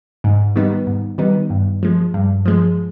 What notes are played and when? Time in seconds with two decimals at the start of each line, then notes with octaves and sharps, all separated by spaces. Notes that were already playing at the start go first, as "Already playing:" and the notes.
0.24 G#2
0.56 D#3 G3 B3 D#4
0.87 G#2
1.18 D#3 G3 B3 D#4
1.50 G2
1.83 F3 G#3
2.14 G2
2.45 F3 G#3